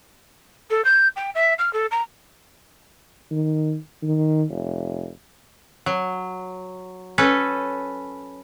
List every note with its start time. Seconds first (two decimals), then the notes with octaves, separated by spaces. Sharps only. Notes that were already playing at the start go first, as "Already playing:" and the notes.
0.70 A4
0.84 G6
1.16 G5
1.34 E5
1.58 F6
1.73 A4
1.91 A#5
3.32 D#3
4.03 D#3
4.50 F1
5.86 F#3
7.18 C#4 A4 B4